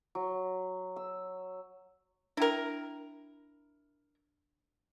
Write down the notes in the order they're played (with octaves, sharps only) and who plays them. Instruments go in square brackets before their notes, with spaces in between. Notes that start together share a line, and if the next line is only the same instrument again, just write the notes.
[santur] F#3
E6
[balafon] D4 G5 [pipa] E4 A#4